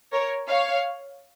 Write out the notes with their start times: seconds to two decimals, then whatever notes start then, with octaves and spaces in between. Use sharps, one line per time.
0.12 A#4 C#5
0.49 C#5 F5